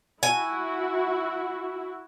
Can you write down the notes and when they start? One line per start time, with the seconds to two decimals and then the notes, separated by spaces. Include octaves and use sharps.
0.23 E4 F#4 G#5